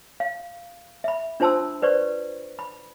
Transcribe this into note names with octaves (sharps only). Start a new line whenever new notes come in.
F5
E5 B5
D4 F4 C5 A5 C6 E6
B4 C5 D5 C#6
B5